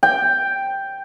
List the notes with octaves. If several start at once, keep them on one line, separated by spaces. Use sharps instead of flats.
G5